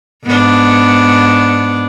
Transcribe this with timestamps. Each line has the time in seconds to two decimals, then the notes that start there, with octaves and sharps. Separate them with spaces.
0.25 G#2 B3 D4